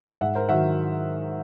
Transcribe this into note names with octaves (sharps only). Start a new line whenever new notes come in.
G#2 E5 F#5
A#4 C5
D#3 F#3 E5 F#5